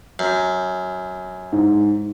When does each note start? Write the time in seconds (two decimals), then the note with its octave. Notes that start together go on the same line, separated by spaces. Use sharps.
0.19 F#2
1.52 G#2